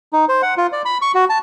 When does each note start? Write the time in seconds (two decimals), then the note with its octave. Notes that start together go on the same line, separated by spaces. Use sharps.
0.13 D#4
0.29 C5
0.42 F#5
0.57 F4
0.72 D5
0.85 B5
1.02 C#6
1.15 F#4
1.29 A5